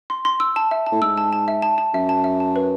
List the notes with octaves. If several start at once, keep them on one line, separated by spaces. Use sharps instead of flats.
C6
C6
E6
A5
E5
A5
A2
G#2 E6
A5
A5
E5
A5
A5
F#2 E5
A5
E5
A5
B4